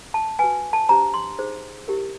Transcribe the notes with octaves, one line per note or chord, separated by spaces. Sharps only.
A5
F#4 B4 G#5
A5
D4 G4 C5 A#5
C6
D#4 G#4 C5
E4 G4 A#4